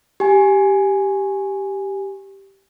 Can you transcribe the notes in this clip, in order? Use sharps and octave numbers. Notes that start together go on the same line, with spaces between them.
G4 G#5